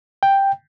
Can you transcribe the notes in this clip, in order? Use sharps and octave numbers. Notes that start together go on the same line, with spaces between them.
G5